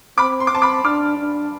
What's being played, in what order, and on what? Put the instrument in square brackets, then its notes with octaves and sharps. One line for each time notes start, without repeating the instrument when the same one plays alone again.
[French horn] C4 [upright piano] B5 D6
[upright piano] C6
D6
[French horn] C4 [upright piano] A5 C6
[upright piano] B5 D6
[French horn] D4 [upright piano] D6 F6
[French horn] D4